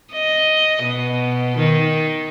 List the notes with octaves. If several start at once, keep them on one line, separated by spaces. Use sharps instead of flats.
D#5
B2
D#3